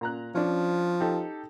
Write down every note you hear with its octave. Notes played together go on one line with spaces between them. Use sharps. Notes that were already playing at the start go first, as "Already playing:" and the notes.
A#2 A#5 F#6
F3 C#4 D4
D#4 G4 A4